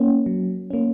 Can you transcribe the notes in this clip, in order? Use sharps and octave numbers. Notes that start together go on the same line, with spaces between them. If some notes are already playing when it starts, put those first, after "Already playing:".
Already playing: A#3 C#4
F#3
A#3 C#4